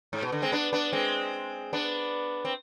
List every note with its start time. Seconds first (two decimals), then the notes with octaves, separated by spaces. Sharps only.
0.13 G#2
0.22 B2
0.32 D3
0.42 G#3 C4
0.52 B3 D4
0.73 B3 D4
0.93 G#3 C4
1.73 B3 D4
2.45 C4